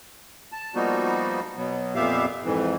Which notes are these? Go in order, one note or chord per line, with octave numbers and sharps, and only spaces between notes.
A5
F3 G3 A#3 B3 D#4 F#4
B2 F#3 B3
F2 A#2 B3 G4 E5 F5
F2 G#2 E3